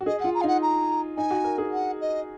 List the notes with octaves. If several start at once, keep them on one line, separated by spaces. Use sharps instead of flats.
F#4
G#4 D#5
F4 F#5
A#5
F5
D#4 F#5
A#5
D#4 G#5
F#4
A#4
G#4
F#5
D#5